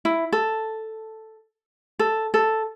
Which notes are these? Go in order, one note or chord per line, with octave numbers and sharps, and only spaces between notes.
E4
A4
A4
A4